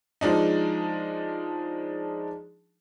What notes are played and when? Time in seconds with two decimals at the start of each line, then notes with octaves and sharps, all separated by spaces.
0.21 F3 G#3 D4 D#4